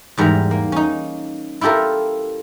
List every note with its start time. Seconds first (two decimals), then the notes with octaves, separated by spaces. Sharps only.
0.17 E2 G#2 G3 A#4 A#5
0.51 A#3
0.72 C#4 D#4
1.61 E4 F4 G4 A4 A#4